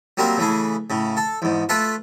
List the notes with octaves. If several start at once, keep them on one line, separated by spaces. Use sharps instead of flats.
F#3 G3 A#3 C4 A#4
C#3 E3 A3 G#4
A2 C#3
A4
E2 G#2
A3 F4 A4 B4